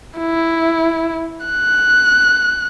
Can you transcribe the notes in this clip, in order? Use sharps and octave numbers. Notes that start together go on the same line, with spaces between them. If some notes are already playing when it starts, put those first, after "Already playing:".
E4
F#6